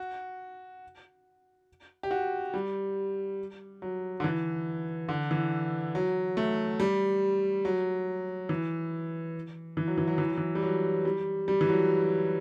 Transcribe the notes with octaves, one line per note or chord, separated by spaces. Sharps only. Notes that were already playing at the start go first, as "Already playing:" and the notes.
Already playing: F#4
G4
F#4
G3
F#3
D3
E3
D3
E3
F#3
A3
G3
F#3
E3
E3
F#3
E3
F#3
E3
F#3
E3
G3
F#3
G3
G3
E3
F#3